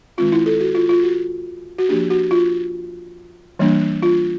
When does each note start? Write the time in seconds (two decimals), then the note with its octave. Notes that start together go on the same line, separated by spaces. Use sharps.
0.18 D#3 G#3 C4 F4
0.32 E4
0.46 A4
0.60 F#4
0.75 F4
0.89 F4
1.03 F#4
1.78 F#4
1.89 F3 A#3 D4 G4
2.10 F#4
2.31 F4
3.59 E3 G3 A#3 D4
4.03 F4